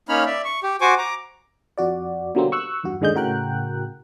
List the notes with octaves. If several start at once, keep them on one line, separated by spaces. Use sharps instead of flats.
A#3 C#4 D#4 C#5 B5 F6
D5 E5
C#6
G4
F#4 C5 G#5 C#6 D6
A#5 D6
F2 F#4 D5
B2 D3 F#3 G3 A#3 C4
C#6 E6 F#6
E2 G2 F#4
D#2 G#2 D3 G#3 D#5 G6
A2 C#3 F#4 A#4 G5 F#6